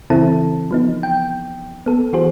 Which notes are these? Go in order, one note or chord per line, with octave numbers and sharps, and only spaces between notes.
C#3 E3 C4 E4 A4 A5
F3 B3 D#4
G5
B3 A4
E3 F#4 G#4 C5